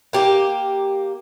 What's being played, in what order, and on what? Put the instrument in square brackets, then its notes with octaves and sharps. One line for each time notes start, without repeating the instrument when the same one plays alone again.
[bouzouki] A#3 G4